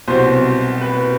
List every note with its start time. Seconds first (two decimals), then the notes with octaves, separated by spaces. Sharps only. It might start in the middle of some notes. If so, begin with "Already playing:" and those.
0.08 C2 B2 F#3 C4 C5
0.81 B4